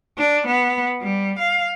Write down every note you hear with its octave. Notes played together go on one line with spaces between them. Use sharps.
D4
B3
G3
F5